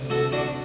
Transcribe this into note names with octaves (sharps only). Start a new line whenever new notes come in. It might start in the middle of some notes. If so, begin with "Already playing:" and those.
Already playing: D2 C3
F#4 A4
D4 F#4